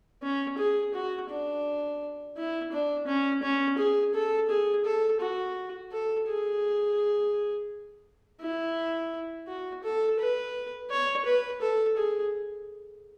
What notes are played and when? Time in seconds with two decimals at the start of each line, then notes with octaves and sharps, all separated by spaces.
0.23 C#4
0.58 G#4
0.94 F#4
1.30 D4
2.37 E4
2.72 D4
3.07 C#4
3.43 C#4
3.78 G#4
4.14 A4
4.49 G#4
4.85 A4
5.20 F#4
5.92 A4
6.27 G#4
8.41 E4
9.47 F#4
9.84 A4
10.19 B4
10.91 C#5
11.25 B4
11.62 A4
11.97 G#4